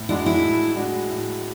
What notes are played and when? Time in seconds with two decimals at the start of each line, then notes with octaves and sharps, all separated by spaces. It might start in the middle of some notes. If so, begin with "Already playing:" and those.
Already playing: A2
0.09 G#3 D4 E4 F#4
0.26 E4
0.42 A2
0.76 G#3 D4 F#4
1.09 A2